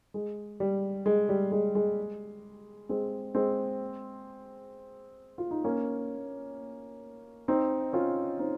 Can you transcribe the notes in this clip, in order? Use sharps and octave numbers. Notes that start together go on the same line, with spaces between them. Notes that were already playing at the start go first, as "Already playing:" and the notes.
G#3
G3
G#3
G3
G#3
G#3
G#3 C4
G#3 C4
F4
D#4
A#3 C#4
C4 D#4
C#4 F4
C4 D#4